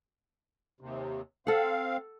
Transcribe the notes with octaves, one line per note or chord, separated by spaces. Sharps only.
D#2 C3
C4 A4 F5 F#5